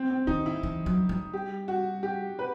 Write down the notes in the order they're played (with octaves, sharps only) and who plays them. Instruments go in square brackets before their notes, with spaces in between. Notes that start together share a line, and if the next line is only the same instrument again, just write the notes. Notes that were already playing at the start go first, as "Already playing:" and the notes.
Already playing: [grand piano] C4
C4
[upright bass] D#3 [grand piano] D#4
[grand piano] E4
[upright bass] E3
F#3
G3
[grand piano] G4
F#4
G4
B4